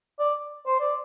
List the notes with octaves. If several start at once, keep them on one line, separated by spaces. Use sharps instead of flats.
D5
C5
D5